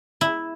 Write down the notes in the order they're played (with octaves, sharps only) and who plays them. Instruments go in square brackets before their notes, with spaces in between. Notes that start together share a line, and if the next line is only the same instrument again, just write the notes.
[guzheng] E4